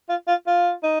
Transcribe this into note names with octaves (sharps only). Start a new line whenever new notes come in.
F4
F4
F4
D#4